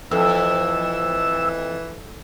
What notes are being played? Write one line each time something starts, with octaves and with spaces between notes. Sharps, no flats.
F2 E3 A4 E6